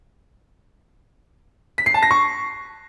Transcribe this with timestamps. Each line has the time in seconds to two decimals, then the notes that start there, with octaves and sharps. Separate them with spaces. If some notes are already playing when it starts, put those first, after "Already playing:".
1.78 B6
1.86 C7
1.94 A5
2.03 A#6
2.11 C#6